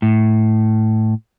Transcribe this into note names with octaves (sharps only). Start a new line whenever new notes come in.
A2